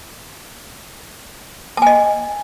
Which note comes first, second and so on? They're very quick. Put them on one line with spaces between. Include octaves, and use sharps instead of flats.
A5 G#5 D#5